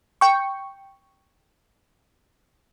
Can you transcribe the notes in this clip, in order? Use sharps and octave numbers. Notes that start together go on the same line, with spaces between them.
G5 C#6